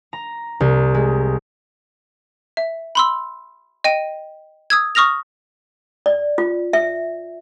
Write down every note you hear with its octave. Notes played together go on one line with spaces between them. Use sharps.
A#5
C2
G#3
E5
B5 C6 E6
D#5 G5 D#7
D#6 E6 G#6
C#6 D#6 F6 A#6 F7
D5
F4
E5